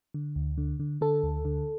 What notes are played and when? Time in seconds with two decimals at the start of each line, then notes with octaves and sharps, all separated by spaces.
0.14 D3
0.36 D2
0.58 D3
0.80 D3
1.01 D3 A4
1.23 D2
1.45 D3